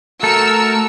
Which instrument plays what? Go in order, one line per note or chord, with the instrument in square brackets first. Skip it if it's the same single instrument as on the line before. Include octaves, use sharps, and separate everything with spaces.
[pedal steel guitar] A3 A4 [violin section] F#4 E6 C#7 [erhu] A#4